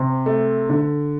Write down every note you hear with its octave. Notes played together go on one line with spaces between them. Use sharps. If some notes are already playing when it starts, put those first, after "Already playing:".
Already playing: C3
A3
D3